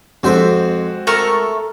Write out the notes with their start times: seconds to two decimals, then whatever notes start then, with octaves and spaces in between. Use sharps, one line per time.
0.23 F2 G#3 C4 F#4 C5 E5
1.07 A3 A4 A#4 C#6